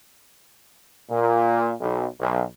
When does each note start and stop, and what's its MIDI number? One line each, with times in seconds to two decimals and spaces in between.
1.09 1.72 46
1.79 2.05 35
2.18 2.41 35